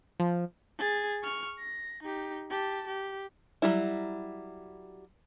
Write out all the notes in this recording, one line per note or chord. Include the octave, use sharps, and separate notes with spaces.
F3
G#4 A6
C#6 F6
A#6
D#4 G4
G4 A5
G4
F#3 G3 E4